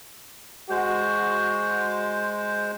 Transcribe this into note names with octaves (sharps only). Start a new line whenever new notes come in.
G#3 F#4 C5